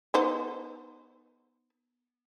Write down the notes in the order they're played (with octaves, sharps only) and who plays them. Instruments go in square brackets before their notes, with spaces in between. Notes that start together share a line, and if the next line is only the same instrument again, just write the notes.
[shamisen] B3 D#4 C5